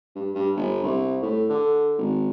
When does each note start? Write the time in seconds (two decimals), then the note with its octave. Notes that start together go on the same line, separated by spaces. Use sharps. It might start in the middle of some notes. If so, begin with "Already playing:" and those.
0.15 G2
0.35 G2
0.56 G1
0.84 C2
1.23 A2
1.49 D3
1.98 G#1